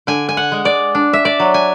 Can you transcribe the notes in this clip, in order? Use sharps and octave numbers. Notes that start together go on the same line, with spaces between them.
D3 G#5
G#5
F#5
G#3
D5
D4
E5
D5
F#3
G#5